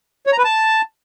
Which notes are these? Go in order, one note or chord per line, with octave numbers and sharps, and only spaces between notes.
C#5
A#5
B4
A5